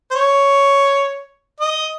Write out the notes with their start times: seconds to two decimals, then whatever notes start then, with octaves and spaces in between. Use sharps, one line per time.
0.11 C5
0.15 C#5
1.61 D#5